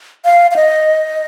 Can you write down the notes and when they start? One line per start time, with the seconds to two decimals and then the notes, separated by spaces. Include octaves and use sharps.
0.25 F5
0.51 F5
0.56 D#5